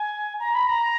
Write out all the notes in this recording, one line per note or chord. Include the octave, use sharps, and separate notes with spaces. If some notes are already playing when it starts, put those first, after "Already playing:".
Already playing: G#5
A#5
B5
A#5